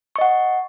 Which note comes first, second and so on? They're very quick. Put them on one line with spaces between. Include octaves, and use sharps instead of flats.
C#6 D#5 F#5